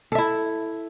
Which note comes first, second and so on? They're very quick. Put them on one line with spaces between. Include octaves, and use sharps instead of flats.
A4 E5 E4